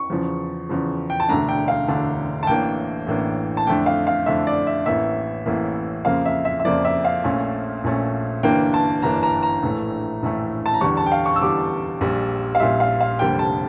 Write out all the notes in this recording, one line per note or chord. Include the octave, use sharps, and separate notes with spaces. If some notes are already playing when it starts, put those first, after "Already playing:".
Already playing: C#6
E2 C#3 F3
E2 C#3 F3
G5
A5
E1 D2 D3 A3 D4 A#5
G5
F5
E1 D2 D3 A3 D4
A5
A1 A2 E3 A#3 D4 G5
A1 A2 E3 A#3 D4
A5
F2 D3 A3 D4 G5
F5
F5
F2 D3 A3 D4 E5
D5
E5
A1 A2 E3 A#3 E5
A1 A2 E3 A#3
F2 C#3 F3 A#3 F5
E5
E5
E5
F2 C#3 F3 A#3 D5
E5
F5
A#1 A#2 A3 C#4
A#1 A#2 A3 C#4
G1 G2 E3 A#3 D4 G5
A5
G1 G2 E3 A#3 D4 A#5
A#5
A#5
A#1 A2 E3 A3
A#1 A2 E3 A3
A5
A#5
E2 D3 G3 C#6
A5
G5
F5
C#6
E6
E2 D3 G3 D6
A#1 A#2 G3
F5
A#1 A#2 G3 E5
F5
F5
F1 F2 D3 G3 A#3 G5
A5